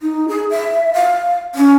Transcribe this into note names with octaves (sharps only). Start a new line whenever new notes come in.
D#4
G#4
E5
F5
C#4